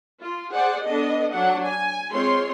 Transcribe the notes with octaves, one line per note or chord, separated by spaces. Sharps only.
F4
G#4 C5 D5 F#5
B3 D4 A4 D#5
F#3 D4 F#5
G#5
G#3 C4 F4 C#5 C6